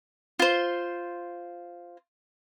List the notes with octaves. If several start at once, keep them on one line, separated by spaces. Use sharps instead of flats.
F4 C5